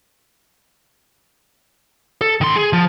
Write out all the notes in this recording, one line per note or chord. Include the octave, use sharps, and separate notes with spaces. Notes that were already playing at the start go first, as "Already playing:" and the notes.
A4
D#3 C6
G#4
F3